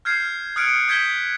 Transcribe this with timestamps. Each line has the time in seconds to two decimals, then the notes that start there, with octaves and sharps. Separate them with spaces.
0.05 F6 G6 G#6 C7
0.56 D#6 F6 F#6 G#6 C#7 D7
0.88 D#6 G6 G#6 B6 G7